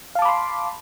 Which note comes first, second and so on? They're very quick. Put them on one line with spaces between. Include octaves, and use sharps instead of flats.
F5 A5 D6 B5 C6